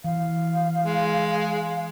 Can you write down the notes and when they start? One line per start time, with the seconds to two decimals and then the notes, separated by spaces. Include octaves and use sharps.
0.04 E3 F5
0.85 G#3